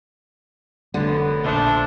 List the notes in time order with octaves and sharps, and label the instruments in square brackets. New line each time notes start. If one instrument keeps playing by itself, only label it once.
[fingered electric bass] F1 G3 A3 [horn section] F#2 B3 [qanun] D3
[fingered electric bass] A#1 B2 [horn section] F3 A3 [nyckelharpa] D4